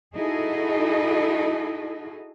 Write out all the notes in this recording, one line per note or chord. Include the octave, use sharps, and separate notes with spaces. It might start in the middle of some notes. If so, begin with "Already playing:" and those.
D#4 E4 F#4 G#4 A4 D#5